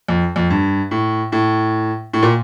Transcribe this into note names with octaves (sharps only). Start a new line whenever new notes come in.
F2
F2
G2
A2
A2
A2
A#2